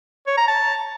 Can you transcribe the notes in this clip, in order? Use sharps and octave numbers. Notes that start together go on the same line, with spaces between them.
C#5
A#5
A5